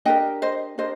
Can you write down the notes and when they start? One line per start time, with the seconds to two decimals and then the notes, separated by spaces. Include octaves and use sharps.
0.05 D4 G4 A#4 D#5 G5
0.42 C5 D#5
0.78 D4 G4 A#4 C5 D#5